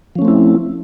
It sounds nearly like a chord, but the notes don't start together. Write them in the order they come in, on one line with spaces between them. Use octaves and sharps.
F3 C#4 A3 C4 E4